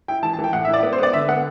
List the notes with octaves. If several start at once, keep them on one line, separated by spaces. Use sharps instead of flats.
E4 G5
E3 A5
A5
E3
G5
A2 F#5
E4 E5
D5
B3
C5
B3 D5
D3 E5
B3 F#5